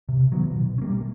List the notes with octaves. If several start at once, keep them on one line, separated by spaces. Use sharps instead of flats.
C3
D#3 F#3 B3
B2
C#4
G3 A#3